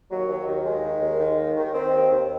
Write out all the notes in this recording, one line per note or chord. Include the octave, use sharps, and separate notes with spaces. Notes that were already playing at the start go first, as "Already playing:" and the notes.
D#2 F#3
D#2
D#3
D#2 G#3
D#3
D#2
D#3
D#2
D#3
D#3 C4
D#2
D#2